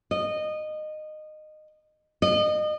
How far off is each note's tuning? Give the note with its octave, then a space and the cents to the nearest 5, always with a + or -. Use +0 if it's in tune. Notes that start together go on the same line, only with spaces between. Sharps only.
D#5 -20
D#5 -30